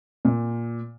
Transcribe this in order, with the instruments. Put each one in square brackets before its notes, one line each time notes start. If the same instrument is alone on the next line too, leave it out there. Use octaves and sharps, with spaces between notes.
[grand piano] A#2